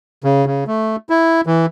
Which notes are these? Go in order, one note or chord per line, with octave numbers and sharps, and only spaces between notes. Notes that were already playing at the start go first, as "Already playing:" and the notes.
C#3
C#3
A3
E4
E3